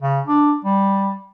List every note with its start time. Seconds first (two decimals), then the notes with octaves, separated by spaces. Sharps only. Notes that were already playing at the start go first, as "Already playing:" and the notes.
0.02 C#3
0.26 D4
0.65 G3